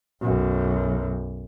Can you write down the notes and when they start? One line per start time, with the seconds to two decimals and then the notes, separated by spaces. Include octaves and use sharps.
0.21 B1 F#2